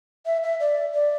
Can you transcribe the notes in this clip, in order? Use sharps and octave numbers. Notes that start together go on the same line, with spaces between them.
E5
E5
D5
D5